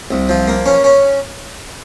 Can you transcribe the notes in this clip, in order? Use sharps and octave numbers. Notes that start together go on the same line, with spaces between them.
C2
F3
A#3
C#4
C#4